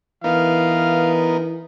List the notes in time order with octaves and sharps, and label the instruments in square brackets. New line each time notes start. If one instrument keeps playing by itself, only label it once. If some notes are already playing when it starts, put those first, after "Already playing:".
[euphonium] E3 [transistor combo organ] B3 D#4 A#4 [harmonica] F5